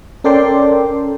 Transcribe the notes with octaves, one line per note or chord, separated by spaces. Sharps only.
C#4 A4 A#4 D5 G5 C6